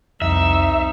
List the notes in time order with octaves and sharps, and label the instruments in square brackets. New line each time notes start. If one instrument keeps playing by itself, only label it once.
[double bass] C2 [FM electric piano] F2 [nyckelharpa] D#4 [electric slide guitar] E5